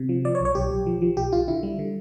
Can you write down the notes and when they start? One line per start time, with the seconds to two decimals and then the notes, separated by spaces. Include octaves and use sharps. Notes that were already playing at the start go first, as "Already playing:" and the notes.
Already playing: C3
0.09 F3
0.25 F3 D5
0.35 C#5
0.40 B1
0.45 C#5
0.55 B1 G4
0.71 B1
0.86 F3
1.02 F3
1.17 B1 G4
1.33 B1 F4
1.48 D3 E4
1.63 G3
1.79 D3